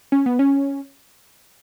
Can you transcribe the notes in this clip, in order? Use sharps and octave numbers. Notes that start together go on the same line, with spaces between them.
C#4
B3
C#4